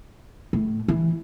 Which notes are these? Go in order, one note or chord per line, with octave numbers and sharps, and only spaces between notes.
A2
E3